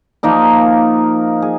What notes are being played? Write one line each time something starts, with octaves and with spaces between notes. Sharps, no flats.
F3 A#3 D#4 A#4
G#4